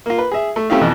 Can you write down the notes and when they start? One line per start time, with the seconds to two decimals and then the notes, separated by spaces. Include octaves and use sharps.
0.06 A#3 F4
0.18 B4
0.31 G#4 E5
0.56 A3
0.70 A3 C4 C#4 E4 G4 F5
0.81 F2 B2 E3 F3